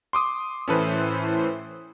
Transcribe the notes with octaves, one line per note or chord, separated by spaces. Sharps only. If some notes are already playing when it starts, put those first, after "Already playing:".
C6 D6 D#6
A2 E3 C#4 A4 B4 C5